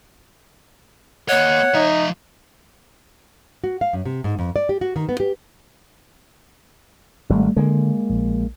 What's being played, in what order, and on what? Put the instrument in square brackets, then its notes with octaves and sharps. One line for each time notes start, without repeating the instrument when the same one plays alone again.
[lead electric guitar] A#3 D#5 [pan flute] C#5 [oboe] F#5
[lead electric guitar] F3 E5 [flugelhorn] D#4
[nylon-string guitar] F#4
F5
F#2
C3
G#2
F2
D5
G4
F#4
D#3
B3
G4
[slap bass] G#1 [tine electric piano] G3 A3
[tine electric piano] D3 [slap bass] G#3 A#3
[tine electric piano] A#1